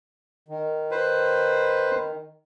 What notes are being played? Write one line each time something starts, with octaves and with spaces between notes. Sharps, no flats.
D#3
B4 C5